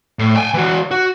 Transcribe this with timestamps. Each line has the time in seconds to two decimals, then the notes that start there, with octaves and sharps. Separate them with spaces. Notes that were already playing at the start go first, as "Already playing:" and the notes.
0.19 A2
0.36 G5 G#5
0.54 E3 F#4
0.91 F#4